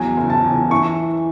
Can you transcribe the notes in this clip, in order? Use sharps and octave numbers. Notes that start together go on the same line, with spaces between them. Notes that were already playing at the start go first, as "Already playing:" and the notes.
Already playing: E2 F#3 G#5
F#1
A5
E2
E3 C#6